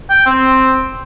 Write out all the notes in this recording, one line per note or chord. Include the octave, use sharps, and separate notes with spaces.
G5
C4